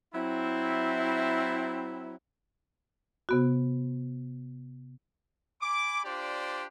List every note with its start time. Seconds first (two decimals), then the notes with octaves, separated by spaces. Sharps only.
0.14 F#3 C4 E4
3.29 C3 B3 F#4
5.62 G#5 B5 D6
6.04 D4 F4 G4 C5 D5